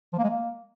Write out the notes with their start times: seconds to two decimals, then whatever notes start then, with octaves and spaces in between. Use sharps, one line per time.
0.13 F3
0.18 A#3
0.24 G#3
0.29 A#3